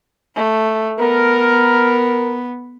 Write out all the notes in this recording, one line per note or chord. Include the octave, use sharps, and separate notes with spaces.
A3
B3 A#4